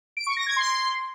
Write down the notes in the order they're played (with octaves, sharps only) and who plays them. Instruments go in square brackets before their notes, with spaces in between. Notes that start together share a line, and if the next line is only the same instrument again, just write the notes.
[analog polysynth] D7
C#6
A#6
G#6
C6